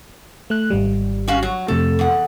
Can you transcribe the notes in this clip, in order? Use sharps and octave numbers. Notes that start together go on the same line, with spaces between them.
A3 F#6
G#1 G3
C#4 F#4 F5
F#3
F2 C3 A3 A4
E2 F#5